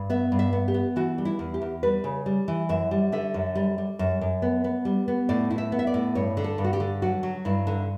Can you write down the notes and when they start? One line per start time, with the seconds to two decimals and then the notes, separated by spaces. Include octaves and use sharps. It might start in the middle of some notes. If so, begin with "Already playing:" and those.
Already playing: G2
0.10 B3 E5
0.32 G2
0.39 E5
0.53 B3
0.68 G4
0.74 B3
0.96 E3 F#4
1.18 G3
1.25 E4
1.39 E2
1.54 G4
1.62 E2
1.83 G3 B4
2.04 C#3
2.26 G3
2.48 E3
2.69 F#2 E5
2.91 G3
3.12 D3 E5
3.34 F#2
3.55 G3
3.78 G3
3.99 F#2
4.21 F#2
4.42 B3
4.64 B3
4.85 G3
5.08 B3
5.29 A2 D5
5.50 E4
5.58 E5
5.72 B3
5.79 E5
5.87 D5
5.94 A2
6.15 G2 C#5
6.37 D3
6.44 A4
6.58 G2
6.64 F#4
6.73 G4
6.80 D3
7.02 F#3 F#4
7.23 F#3
7.45 G2 E4
7.67 D3